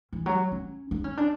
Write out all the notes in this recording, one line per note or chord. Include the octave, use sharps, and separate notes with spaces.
E3
F#3
C#4
D4
C#4
D4